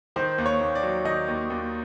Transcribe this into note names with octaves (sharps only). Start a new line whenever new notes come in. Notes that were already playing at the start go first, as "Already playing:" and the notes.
D#3 C5
D#2
C#5
D#2
D5
F#3
D#3 D#5
D#2
D#2